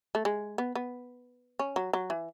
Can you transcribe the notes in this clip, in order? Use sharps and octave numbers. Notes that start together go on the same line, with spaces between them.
A3
G#3
B3
B3
C#4
F#3
F#3
E3